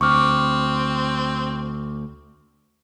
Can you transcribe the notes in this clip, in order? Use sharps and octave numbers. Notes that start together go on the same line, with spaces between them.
D2 C4 C#6 D6 F6